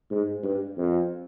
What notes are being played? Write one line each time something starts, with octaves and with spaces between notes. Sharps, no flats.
G#2
G2
F2